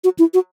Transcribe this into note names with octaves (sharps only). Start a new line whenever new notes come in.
F#4
E4
F#4